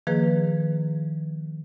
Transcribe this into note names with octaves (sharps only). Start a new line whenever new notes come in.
D#3 F3 A#3 G#4 B4